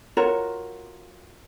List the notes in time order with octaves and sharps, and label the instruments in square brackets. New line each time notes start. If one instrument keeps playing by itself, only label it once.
[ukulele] F4 F#4 A#4 C#5